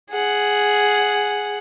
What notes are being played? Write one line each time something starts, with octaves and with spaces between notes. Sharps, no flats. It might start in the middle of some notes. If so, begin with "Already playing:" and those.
G#4 F#5